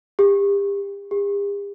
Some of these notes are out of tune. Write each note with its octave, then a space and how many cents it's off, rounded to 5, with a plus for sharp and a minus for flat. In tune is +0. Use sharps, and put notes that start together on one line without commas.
G4 +35
G4 +45